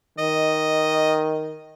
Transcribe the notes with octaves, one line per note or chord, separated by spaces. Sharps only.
D#3 D#5